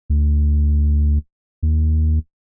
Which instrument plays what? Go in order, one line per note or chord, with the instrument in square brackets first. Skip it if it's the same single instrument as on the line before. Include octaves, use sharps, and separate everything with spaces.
[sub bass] D2
D#2